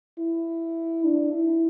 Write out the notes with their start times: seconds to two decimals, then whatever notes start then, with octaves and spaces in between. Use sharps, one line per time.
0.19 E4
1.05 D4
1.33 E4